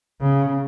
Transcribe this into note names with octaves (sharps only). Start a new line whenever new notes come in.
C#3